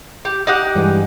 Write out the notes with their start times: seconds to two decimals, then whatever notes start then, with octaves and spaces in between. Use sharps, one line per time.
0.25 G4
0.47 D#4 G4 F#5
0.75 G2 E3 G#3